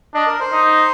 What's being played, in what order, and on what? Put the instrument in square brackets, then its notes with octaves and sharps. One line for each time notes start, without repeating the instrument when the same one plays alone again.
[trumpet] D4 [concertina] D#5
[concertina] A#4
C5
[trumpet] D#4